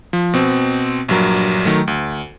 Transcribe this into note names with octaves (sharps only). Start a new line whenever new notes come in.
F3
B2 C4
A#1 G2 F#3 A#4
D#3 F#3 A3
D2